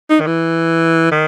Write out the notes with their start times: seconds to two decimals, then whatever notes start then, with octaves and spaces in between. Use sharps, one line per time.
0.10 D#4
0.20 D#3
0.27 E3
1.11 D#3